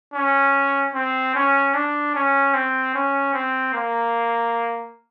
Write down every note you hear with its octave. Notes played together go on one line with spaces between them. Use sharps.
C#4
C4
C#4
D4
C#4
C4
C#4
C4
A#3